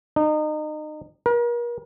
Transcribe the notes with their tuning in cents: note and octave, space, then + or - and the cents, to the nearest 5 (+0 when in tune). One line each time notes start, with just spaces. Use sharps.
D#4 -30
A#4 +40